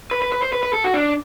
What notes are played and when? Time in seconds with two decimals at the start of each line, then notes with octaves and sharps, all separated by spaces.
0.11 B4
0.22 B4
0.32 B4
0.43 C5
0.53 B4
0.63 B4
0.73 A4
0.84 F#4
0.94 D4